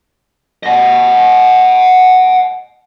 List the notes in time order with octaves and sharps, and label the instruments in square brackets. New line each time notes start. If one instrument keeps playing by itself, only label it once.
[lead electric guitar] D#5 F#5